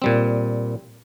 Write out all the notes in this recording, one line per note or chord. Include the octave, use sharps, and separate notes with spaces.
A#2 G3 C4